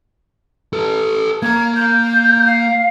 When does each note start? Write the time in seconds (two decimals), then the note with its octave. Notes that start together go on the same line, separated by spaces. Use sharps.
0.73 A4 B4
1.42 A#3 A#5 G#6
1.76 G6
2.46 F5